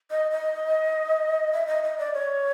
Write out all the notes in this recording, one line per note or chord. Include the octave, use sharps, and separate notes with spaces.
D#5
D#5
E5
D#5
D#5
D5
C#5